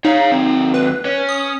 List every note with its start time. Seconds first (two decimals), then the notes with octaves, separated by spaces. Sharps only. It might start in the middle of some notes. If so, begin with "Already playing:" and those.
0.05 D#4 C#5 F5
0.31 D#2 C4
0.74 B4
1.05 C#4 C#5
1.29 D#6